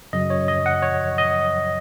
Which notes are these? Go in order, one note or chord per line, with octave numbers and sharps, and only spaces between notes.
F#2 C#3 F#3 D#5
C#5
D#5
F#5
C#5
D#5